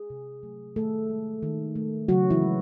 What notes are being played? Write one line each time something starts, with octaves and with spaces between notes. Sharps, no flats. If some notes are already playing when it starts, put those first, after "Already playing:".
Already playing: G#4
C3
F#3 A3
D#3 A3 A4
G#3
D#3
A3
C#3 F#3 F#4
E3 E4
G#3